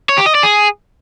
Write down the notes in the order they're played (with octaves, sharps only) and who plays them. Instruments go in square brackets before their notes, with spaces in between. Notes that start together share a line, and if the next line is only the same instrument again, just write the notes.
[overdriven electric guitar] C#5
G4
D#5
D5
G#4